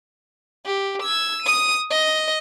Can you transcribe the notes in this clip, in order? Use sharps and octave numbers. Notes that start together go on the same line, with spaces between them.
G4
E6 G#6
D#6 D#7
D#5